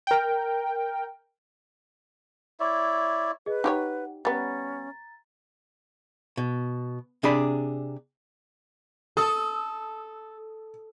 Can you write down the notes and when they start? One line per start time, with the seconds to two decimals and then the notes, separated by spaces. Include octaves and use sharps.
0.07 A#4 G5
2.60 E4 C#5 D5 E5
3.46 G#4 B4 D#5
3.64 D#4 G4 C#5 F#5
4.25 G3 B3 C#4 A#5 A6
6.37 B2
7.23 C3 D4 G#4 D5 B5
9.17 A4 D#6